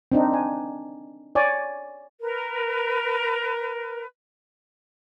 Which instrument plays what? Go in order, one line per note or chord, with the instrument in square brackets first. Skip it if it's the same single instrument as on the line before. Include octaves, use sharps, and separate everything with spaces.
[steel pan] C4 D4 D#4
G#5
C#5 D5 G#5
[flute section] A#4 B4